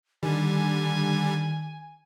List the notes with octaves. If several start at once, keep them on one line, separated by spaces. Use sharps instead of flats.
D3 D#3 G3 G#5